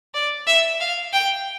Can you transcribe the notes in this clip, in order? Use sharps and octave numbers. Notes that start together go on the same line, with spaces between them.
D5
E5
F5
G5